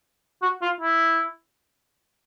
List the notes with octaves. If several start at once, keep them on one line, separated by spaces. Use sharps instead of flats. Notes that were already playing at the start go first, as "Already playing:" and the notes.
F#4
F4
E4